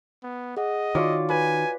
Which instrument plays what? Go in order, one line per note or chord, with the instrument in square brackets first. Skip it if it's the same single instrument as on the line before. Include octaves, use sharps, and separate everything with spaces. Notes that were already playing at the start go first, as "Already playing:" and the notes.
[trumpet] B3
[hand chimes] G#4 F#5 [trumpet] D#5
[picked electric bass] D#3 [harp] F4 C#5 D5 [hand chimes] F#4
[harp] B4 [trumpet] G#5